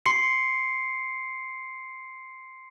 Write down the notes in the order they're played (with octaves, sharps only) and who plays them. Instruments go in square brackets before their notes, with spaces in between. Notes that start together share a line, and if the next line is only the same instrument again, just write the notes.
[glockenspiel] C6 C7 C#7